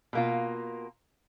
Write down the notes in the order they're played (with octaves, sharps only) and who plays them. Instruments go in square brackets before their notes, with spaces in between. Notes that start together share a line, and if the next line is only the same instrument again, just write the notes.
[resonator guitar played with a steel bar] B2 A#3 F4